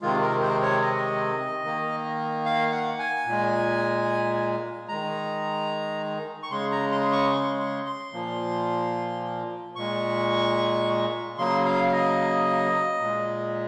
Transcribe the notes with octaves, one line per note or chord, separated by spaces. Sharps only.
C3 D#3 G#3 F4
A#4
C5
C#5
D#5
D#3 A#3
F5
F#5
G#5
A#2 G#3
D#3 G#3 A#5
C#6
C#3 G#3 C6
A#5
C6
C#6
C6
C6
C6
A#2 F3 A#3
A#2 G#3 C#6
C#3 F#3 A#3 C6
F5
D#5
A#2 G#3